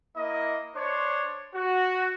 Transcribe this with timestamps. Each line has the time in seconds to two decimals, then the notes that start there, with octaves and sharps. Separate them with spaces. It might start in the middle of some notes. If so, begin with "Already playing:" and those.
0.17 A#3 E4 D#5
0.76 D4 C5 C#5
1.55 F#4